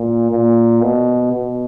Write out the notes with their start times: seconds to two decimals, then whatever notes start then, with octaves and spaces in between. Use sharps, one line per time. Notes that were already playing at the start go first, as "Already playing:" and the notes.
Already playing: A#2
0.31 A#2
0.81 B2
1.33 B2